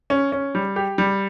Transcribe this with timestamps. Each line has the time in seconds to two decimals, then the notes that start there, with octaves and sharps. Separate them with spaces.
0.10 C#4
0.32 C#4
0.55 G3
0.76 G4
0.98 G3